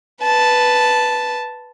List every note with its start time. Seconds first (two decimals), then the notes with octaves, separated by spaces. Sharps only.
0.23 B4 A5